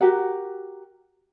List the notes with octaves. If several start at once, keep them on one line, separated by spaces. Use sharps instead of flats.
F#4 G4 A#4 F#5